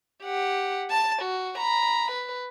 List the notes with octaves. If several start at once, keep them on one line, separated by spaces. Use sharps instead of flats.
G4 F#5
A5 A6
F#4
A#5 B5
B4